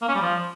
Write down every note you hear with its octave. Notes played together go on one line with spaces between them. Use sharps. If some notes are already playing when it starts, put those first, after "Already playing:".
A#3
C#4
G3
F3